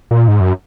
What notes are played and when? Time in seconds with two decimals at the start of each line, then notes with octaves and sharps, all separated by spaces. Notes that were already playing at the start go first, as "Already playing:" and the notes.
0.11 A#2
0.28 G#2
0.40 F#2